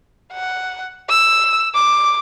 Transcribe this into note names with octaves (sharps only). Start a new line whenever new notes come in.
F#5
E6
D6